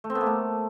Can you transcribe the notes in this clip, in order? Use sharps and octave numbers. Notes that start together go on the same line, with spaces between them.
A3
C4
B3
A#3
A3